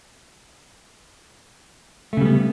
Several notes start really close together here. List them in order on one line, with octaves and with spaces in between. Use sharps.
A3 C#3 G3 B3